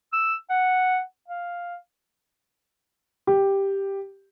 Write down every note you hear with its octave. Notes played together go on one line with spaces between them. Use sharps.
E6
F#5
F5
G4